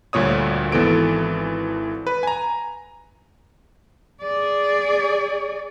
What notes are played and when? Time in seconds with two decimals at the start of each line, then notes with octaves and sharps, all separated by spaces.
0.13 D2 G2 A#2 C#5 D#6
0.72 G#1 E3 B3 A4 D7
2.07 B4
2.23 G#5 A#5
4.22 G#4 D5